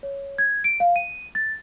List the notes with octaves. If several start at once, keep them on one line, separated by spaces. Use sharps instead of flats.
C#5
G#6
D7
F5
D#7
A6